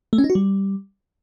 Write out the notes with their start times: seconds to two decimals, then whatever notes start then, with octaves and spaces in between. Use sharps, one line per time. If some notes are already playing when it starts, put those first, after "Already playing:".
0.13 A3
0.18 C#4
0.24 D#4
0.30 F#4
0.35 G3